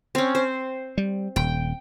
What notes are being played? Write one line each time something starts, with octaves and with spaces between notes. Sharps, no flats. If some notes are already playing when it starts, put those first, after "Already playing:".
C4 C#4
C5
G3
D#1 G5